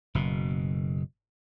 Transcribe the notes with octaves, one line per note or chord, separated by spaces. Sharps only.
F#1 B2